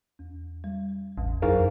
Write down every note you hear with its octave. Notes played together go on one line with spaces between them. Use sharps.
E2
G3
A1 E2
F#2 D#4 E4 G#4 A#4 C5 F5